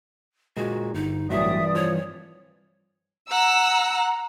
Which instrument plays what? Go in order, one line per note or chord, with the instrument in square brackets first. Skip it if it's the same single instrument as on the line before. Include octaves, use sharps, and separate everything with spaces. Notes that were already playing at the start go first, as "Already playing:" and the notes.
[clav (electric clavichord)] A#2 G#3 [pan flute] F#4
[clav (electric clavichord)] G1 [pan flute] D#4
[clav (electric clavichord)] A1 F#3 [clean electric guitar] G2 E3 [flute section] D5 D#6 [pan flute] E5
[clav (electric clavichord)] F3 [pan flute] C#5
[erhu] F#5 [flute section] A#5 [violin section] E6